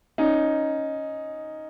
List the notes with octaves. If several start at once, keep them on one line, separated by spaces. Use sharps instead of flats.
C#4 D#4